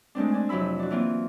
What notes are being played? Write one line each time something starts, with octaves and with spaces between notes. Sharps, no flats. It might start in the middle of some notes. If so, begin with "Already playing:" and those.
G#3 A3 C4 D4
D4 G#5
F2 C3 F#3 E4 B5 E6
D4 F#4
E3 A#3 C4 F4